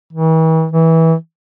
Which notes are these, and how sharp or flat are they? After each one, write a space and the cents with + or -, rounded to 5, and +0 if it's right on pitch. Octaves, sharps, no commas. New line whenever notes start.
E3 -45
E3 -20